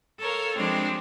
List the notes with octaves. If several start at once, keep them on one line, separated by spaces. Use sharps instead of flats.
A4 A#4 C#5 F5
F3 G3 G#3 C4 D4